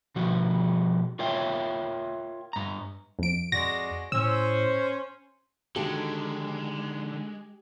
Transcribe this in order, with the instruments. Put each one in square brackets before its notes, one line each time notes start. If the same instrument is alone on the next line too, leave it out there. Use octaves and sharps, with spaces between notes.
[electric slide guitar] B2 F3 G3 F#4
F4 A#4 C#5 E5 F5 G5
G2 A#5
[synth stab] F2 D7
[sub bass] F2 [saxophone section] G#3 F#4 D5 [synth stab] A#6
[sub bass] A2 [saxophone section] C#4 [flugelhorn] C5 [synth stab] E6
[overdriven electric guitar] D3 D#3 [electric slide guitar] G#3 [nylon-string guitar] D4 F#4 A4 [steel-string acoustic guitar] G4